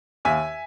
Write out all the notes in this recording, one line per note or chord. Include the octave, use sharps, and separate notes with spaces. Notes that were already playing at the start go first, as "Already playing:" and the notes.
D#2 E5 G#5